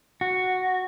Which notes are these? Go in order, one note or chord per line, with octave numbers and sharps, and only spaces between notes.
F#4